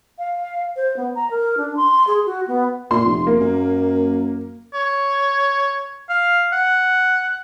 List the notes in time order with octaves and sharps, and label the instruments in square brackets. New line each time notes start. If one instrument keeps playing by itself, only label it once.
[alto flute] F5
C5
B3
A#5
A#4
D4
C6
G#4
F#4
B3
[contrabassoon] A#2 [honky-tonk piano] C6
[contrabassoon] F1
[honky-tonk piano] A#3
[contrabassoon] F#2
[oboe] C#5
F5
F#5